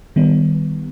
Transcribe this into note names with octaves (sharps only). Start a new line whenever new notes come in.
D#3 G3 B3